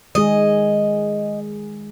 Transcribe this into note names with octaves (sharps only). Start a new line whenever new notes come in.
D#3 G#3 G#4 D#5